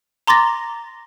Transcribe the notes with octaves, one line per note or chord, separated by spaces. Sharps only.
A#5 C6 D6 A6 A#6